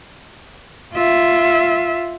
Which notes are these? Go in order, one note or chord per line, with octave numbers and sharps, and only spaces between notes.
F4 E5